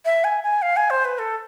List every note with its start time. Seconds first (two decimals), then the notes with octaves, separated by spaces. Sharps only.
0.05 E5
0.24 G#5
0.43 G#5
0.62 F5
0.77 G#5
0.90 C5
1.05 B4
1.19 A4